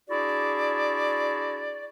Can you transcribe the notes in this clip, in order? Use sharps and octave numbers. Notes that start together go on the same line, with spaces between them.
D4 E4 F#4 G#4 D5